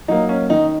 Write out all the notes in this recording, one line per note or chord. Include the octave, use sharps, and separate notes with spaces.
F#3 A#3 D#4
C#4
D#3 D#4